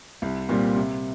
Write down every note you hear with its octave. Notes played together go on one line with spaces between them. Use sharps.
C2
A#2 G3 C4
C3